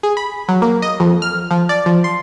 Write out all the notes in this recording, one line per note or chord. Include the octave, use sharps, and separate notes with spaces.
G#4
B5
F#3
A#3
D#5
F2
F6
F3
D5
F3
C6